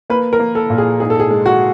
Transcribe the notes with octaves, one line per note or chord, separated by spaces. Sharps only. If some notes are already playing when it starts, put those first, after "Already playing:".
A#3 B4
A#4
A#3
A4
A#2
G#4
G#2 G#4
A4
G#4
G#3
F#4